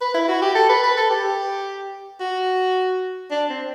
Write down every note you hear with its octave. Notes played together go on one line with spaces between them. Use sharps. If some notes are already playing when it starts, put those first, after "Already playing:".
B4
E4
F#4
G4
A4
B4
B4
A4
G4
F#4
D4
C4